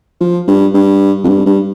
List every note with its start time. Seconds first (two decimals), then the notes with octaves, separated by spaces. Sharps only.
0.21 F3
0.48 G2
0.74 G2
1.24 F2
1.29 G2
1.46 G2